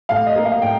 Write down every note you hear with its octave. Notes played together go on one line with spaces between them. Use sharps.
A2 F5
D#5
A#3
F5
A2 G5